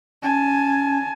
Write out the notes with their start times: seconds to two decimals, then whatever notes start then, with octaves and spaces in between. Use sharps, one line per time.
0.23 C#4 G#5 A5